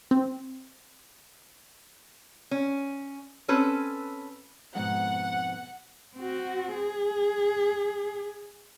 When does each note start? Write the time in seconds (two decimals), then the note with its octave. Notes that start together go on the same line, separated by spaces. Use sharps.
0.11 C4
2.51 C#4
3.48 C4 C#4 A4 B4
4.75 F2 G#2 B2 F#5
6.16 C4 F#4
6.74 G#4